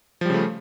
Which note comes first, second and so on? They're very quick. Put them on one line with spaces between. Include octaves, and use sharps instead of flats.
F3 G3 C#3 A3